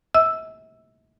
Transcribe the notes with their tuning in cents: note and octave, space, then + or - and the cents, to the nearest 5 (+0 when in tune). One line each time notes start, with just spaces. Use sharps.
E5 -45 E6 +5